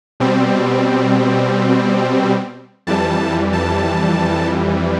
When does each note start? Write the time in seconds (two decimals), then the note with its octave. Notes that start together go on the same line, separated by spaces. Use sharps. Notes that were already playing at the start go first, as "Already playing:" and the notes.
0.20 B2 G3 C4
2.87 F2 E3 G3 A5
3.53 A5